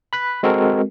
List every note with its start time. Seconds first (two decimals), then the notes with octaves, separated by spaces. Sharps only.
0.13 B5 F#6 B6
0.43 G#3 C4 F#4 A4 A#4